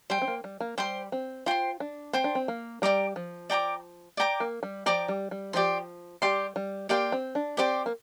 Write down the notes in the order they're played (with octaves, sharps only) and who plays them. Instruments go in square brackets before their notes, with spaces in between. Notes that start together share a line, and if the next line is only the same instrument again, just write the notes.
[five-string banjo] G3 [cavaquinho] C5 G5 C6
[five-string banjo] C4
A#3
G3
A#3
[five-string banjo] G3 [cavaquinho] C5 G5 C6
[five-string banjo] C4
[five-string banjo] F4 [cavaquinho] C5 G5 C6
[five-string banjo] D4
[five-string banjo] C4 [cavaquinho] C5 G5 C6
[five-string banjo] D4
C4
A#3
[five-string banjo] G3 [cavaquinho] D5 G5 A#5 D6
[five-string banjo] F3
[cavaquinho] D5 G5 A#5 D6
D5 G5 A#5 D6
[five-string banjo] A#3
G3
[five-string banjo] F3 [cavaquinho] D5 G5 A#5 D6
[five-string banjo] G3
G3
[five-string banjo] F3 [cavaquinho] G4 D5 G5 C6
[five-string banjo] G3 [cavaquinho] G4 D5 G5 C6
[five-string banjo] G3
[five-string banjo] A#3 [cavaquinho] G4 D5 G5 C6
[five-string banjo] C4
D4
[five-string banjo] C4 [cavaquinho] G4 D5 G5 C6
[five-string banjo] A#3